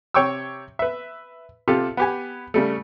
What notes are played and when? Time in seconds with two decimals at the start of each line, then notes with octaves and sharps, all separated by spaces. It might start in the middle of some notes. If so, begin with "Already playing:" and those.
0.14 C3 C#5 G5 C#6 D6 E6
0.79 B4 E5
1.68 C3 F4 G4 A4
1.97 B3 G4 G#5
2.54 C#3 G3 A3